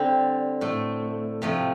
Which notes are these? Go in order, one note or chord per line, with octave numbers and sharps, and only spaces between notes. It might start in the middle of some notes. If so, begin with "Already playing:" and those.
Already playing: D3 G3 C4
A2 A3
C3 F3 A3